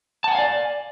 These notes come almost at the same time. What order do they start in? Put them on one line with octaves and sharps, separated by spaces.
A5 F#5 G#5 F5 D5